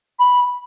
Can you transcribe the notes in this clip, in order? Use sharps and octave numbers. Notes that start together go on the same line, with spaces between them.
B5